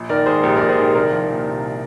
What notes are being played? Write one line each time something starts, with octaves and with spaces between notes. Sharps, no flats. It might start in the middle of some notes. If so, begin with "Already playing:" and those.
Already playing: A#1
D#3 A#4 D5
G#2 G#4 C5
A#1 G4 A#4
A#4 D5
A#1
G#4 C5
D#3 G4 A#4
C2 A#4 D5
F3
A#2
C2